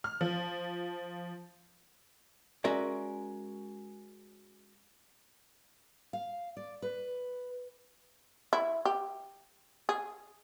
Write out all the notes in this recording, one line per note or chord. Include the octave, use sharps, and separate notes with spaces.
F6
F3
G#3 C#4 F#4 A#4 D5 E5
F5
D5
B4
E4
G4
G#4